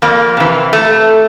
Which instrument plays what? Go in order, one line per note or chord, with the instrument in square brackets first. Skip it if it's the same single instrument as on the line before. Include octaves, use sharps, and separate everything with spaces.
[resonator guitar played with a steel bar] F2 A#3
C3 E3
A3